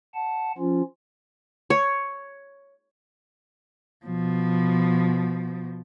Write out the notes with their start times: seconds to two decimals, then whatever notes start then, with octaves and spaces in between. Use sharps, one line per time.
0.14 F#5 A5
0.58 F3 C#4 F4
1.70 C#5
4.06 B2 F3